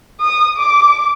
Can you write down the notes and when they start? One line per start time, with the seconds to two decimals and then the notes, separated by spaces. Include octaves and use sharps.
0.21 D#6
0.56 D6